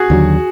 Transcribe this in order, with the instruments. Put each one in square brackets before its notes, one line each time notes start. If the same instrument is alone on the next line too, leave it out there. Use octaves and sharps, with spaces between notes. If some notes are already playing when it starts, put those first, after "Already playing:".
Already playing: [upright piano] F#4 G#4
[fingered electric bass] D#2 D3 F#3